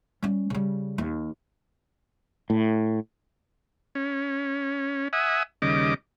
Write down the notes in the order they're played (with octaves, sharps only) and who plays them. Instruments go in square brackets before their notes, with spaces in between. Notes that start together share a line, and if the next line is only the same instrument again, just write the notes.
[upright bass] G3 C#4
C#3 G3
D#2
[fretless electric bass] A2
[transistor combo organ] C#4
E5 F#5 G#5 D#6
D#2 C#3 G3 D#5 D6